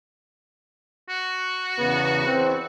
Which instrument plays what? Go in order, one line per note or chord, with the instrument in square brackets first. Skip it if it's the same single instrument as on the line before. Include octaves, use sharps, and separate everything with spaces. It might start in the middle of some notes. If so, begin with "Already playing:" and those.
[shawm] F#4
[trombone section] E2 C#3 B3
E2 C4